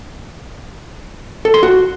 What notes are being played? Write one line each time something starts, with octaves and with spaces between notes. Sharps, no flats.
A4
C6
F#4